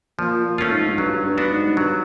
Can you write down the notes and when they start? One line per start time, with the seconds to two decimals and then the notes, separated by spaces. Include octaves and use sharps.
0.19 A#2 F3
0.45 A#2
0.58 A3 C#4 F4
0.72 G#2
0.88 G#2
0.98 G2 F#3
1.24 G2
1.38 B3 D4 F#4
1.51 G#2
1.77 G2 F#3